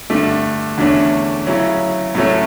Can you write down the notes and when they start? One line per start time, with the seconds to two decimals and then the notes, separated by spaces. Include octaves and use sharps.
0.10 G2 D3 A3
0.78 E2 D3 A3 C#4
1.47 C#3 F#3 C#4 E4
2.15 A2 F#3 A3 C#4